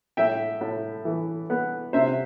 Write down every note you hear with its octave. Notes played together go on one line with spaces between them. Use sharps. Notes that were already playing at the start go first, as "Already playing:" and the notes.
A2 E5 G5
A2
E3
B3
C3 C5 E5